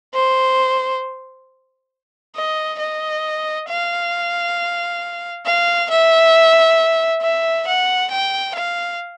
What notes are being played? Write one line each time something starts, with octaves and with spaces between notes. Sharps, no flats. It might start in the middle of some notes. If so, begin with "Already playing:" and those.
C5
D#5
D#5
F5
F5
E5
E5
F#5
G5
F5